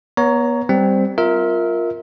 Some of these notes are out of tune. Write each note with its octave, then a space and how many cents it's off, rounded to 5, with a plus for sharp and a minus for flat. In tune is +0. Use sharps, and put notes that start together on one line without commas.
B3 -30 C#5 +20 A#5 +0
G3 +0 C4 +0
F4 +5 A#4 +0 E5 -25